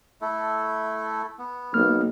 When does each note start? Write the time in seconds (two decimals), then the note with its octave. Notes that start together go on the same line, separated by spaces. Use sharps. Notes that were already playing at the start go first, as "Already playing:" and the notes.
0.22 A3 E4 A4
1.39 B3
1.74 B1 A#3 F6